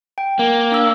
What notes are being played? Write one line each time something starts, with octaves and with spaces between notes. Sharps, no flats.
G5
A#3
D4 E6